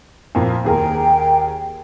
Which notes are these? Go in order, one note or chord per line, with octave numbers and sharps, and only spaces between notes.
F2 A#2 A#3
D#2 G#4 A#4 G5